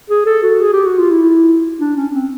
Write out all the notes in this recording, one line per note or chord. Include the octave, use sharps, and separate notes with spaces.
G#4
A4
F#4
G#4
G4
F#4
F4
E4
D4
C#4
C4